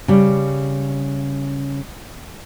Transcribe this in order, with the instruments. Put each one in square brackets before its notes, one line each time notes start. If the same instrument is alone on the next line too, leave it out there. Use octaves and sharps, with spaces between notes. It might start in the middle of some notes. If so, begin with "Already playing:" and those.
[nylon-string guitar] C#3 G3